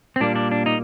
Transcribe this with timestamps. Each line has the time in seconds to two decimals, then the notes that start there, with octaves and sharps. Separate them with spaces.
0.16 C4
0.21 A#2 G3 A#3 D4
0.36 D4
0.51 D4
0.66 D#4